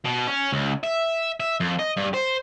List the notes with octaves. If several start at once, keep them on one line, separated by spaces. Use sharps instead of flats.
B2
C#4
C#2
E5
E5
F2
D#5
G2
C5